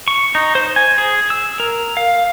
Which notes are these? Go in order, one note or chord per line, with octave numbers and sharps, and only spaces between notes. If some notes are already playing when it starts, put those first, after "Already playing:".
C#6
D#4
C5
G#5
G#4
E6
A#4
F5